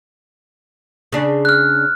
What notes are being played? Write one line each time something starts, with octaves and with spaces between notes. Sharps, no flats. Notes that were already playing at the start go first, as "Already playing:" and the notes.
C#3 D4 G#4
F6 F#6